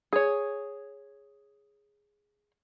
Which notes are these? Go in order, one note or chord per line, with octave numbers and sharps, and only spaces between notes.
G#4 C#5